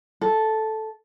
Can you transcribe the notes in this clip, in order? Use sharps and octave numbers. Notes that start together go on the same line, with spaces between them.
A4